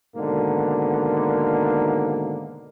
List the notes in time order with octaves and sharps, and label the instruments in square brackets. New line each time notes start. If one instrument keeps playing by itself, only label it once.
[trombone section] G#2 B2 D3 D#3 A#3